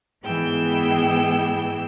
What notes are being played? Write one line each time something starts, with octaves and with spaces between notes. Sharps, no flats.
G#2 E3 B3 G#4 G5 E6